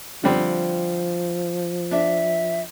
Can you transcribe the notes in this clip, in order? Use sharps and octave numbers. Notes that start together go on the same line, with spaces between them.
D3 F3 G3 C4
D4 E5